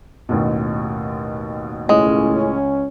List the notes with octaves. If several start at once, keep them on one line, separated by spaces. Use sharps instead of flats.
A1 D#2 B2
C#2 A2 G#3 C#4